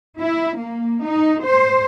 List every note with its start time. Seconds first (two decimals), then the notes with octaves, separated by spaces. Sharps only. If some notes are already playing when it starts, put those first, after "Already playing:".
0.20 E4
0.57 A#3
1.05 D#4
1.44 C5